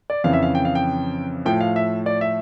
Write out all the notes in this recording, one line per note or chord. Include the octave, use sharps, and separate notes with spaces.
D5
F2 C#3 E3 F5
E5
F5
G5
F5
G5
A2 F3 G5
F5
E5
D5
E5